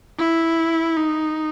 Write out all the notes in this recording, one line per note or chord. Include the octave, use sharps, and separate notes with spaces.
E4
D#4